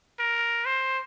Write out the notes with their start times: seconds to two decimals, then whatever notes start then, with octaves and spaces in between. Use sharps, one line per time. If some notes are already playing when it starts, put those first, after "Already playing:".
0.19 A#4
0.65 C5